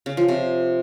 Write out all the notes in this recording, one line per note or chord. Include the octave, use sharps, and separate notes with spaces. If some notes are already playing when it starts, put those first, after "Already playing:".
C#3
F3
C3